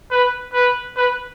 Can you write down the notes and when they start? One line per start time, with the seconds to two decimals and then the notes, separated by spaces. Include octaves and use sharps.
0.11 B4
0.53 B4
0.96 B4